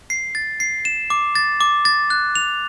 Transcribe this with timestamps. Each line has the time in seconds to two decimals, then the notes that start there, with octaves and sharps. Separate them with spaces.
0.10 C7
0.35 A6
0.60 C7
0.85 E7
1.10 D6
1.35 A6
1.61 D6
1.85 A6
2.10 F#6
2.35 F7